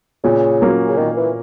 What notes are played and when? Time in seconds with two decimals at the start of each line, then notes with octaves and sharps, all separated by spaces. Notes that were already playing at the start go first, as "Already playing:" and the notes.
0.24 A#2 C#3
0.62 F#3 A#3 C#4
0.88 C#3
0.98 A#2 D#3
1.17 E3